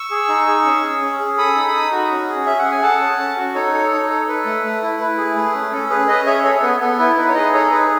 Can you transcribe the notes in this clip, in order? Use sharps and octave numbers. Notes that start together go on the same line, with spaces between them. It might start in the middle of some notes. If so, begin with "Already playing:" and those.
Already playing: C#6 E6
G#4
D#4
G#4
C#4
G#4
C#4
G#4
A4 B5 D#6
D#4
D#4
F#4
C#4
G#4
C#4 E5
F#5
G#4
G#5
A4 F#5 A5
C#4
C#4
F#4
D#4 A4 C#5
A4
D#4
A4
A4 B4
A3
A3
E4
E4 B4
G#4
A3
C#4
C#4 A4
G#4 B4
C#4 B4 D#5
G#4 C#5 E5
A4 C#5
A4
B3 B4
B3 A4
E4 B4
D#4 B4
C#5
G#4 B4 D#5
D#4 A4 C#5
G#4 B4